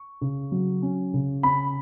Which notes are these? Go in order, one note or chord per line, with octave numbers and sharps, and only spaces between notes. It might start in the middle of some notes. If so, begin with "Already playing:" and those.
Already playing: C#6
C#3
F#3
C#4
C#3
C#4 B5